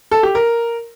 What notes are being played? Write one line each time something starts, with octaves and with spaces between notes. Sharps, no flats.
A4
G4
A#4